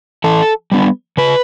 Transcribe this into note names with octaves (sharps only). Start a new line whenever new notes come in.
E3 A4
G3 B3 D4
C#3 B4